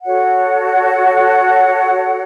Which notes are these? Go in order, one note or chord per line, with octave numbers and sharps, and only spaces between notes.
F#4 A4 C#5 F#5